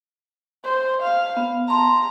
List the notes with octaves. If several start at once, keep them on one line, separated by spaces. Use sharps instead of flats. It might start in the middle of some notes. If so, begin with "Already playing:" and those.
C5
F5
B3
A5 A#5 C6